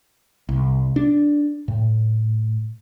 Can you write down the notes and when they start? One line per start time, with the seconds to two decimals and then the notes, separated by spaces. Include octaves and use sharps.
0.49 C2
0.96 D4
1.68 A2